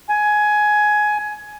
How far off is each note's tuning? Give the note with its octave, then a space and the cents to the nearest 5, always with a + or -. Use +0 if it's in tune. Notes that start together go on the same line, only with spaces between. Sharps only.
G#5 +15